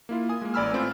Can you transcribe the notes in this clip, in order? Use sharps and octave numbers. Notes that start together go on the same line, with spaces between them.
A#3 E4 F4
G#5 D#6
G#3 A#3
A1 D5 G#5 B5 E6 F6
A3 B3 C4 F4